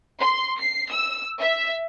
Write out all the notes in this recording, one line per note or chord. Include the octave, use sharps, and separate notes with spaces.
C6
C7
E6
E5